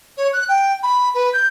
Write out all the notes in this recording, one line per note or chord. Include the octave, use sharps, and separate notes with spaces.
C#5
F#6
G5
B5
B4
G6